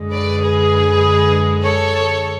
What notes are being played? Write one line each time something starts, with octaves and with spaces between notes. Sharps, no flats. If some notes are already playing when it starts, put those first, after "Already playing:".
Already playing: F#2 D3 G#3
B4 D5
G#4 B4
A4 C#5